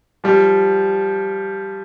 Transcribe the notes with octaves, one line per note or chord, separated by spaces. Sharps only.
F3 G3